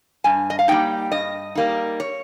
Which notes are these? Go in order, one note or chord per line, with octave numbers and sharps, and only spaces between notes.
G2 G#5
D#5
F5
G3 A#3 D#4 G5
G2 D#5
G3 A#3 D#4
C#5